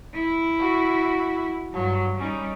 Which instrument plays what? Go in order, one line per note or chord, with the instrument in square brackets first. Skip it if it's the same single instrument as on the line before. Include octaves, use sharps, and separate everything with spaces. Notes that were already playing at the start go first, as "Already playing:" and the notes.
[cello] E4
[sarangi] F#4
[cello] G2 [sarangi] F#3
[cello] G3 D#4 [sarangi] C#4